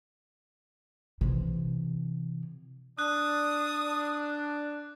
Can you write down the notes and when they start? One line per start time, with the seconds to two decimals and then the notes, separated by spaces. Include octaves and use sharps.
1.21 C3 E3
2.99 D4 D#6 F#6